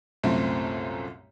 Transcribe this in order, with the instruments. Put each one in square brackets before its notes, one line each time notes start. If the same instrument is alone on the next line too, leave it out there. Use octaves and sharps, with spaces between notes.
[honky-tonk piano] C2 F#2 A#2 A3 C4